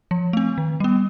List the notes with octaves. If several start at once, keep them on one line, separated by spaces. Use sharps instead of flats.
F3
A3 C4
D#3
G3 B3